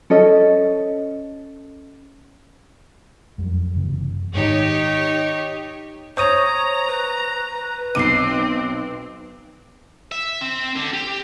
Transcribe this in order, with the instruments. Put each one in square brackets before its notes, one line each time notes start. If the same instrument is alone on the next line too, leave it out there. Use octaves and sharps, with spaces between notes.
[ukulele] C#4 A4 D#5
[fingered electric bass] F2 F#3 G3
F#1 C3 E3
[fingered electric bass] G#2 D#3 [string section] D#4 G4 C#5
[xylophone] C5 D#6 D#7 [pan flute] C#5 [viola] A#5 [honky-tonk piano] C#6
[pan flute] B4
[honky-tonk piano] B1 D6 [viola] C4 [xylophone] C7 D#7
[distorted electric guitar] E5
C4
D3
G4